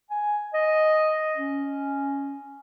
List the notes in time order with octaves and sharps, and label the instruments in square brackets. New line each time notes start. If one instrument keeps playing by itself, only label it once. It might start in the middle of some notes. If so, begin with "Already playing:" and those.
[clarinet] G#5
D#5
C#4